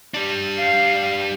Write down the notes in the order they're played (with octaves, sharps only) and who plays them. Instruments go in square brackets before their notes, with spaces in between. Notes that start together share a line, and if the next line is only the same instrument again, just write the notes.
[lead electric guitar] G3 D4
[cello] F5